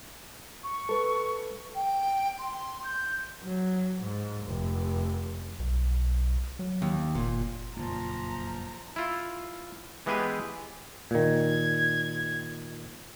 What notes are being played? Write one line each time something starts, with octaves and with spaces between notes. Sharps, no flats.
C#6
A4 B4
G5
C6
G6
F#3
G#2
F1
B1
F#3
D#2
F#1 A#2
F#1 F2 A#2 F3 A#5
E4 F4
E3 G#3 B3 G4 G#4 B4
A#2 D#3 G#6